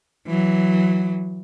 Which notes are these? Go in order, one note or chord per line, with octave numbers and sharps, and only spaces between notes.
E3 F#3